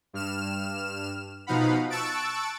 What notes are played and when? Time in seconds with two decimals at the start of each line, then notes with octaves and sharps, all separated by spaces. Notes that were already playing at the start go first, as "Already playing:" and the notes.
0.13 G2 F6 E7
1.47 B2 F3 D#4 F5 F#5 B5
1.90 A5 C#6 E6 F#6 A6 D7